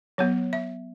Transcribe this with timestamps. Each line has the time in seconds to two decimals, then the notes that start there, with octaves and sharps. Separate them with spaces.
0.18 F#3 B3 C#5
0.53 E5